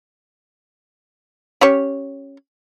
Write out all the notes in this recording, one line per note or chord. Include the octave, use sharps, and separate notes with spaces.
C#4 G4 C#5